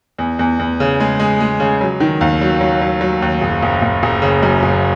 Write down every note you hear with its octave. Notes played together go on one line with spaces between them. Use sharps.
E2
E2
E2
C#3
G#3
G#3
G#3
C#3
F#3
D#3
D#2
F#3
F#3
F#3
F#3
D#2
F#1
F#1
F#1
F#1
C#3
F#2
F#1